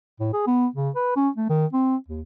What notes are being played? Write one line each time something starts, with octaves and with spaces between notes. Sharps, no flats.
A2
G#4
B3
C#3
B4
C#4
A3
D#3
C4
D#2